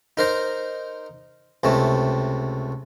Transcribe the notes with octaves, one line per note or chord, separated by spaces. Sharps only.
D#4 A#4 C5 A#5
C#2 C3 A3